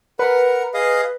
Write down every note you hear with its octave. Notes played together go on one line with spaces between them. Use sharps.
A#4 B4 F#5
G#4 D#5 F5